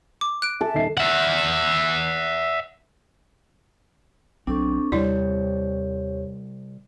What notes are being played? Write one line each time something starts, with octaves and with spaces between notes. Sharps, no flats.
D6
F#6 D7
A4 E5
D#1 D#4 C7
E5 F#5
B1 F#3 C4 D4 A4 C#6
D#2 C3 G3 E4 G4 C#5 D5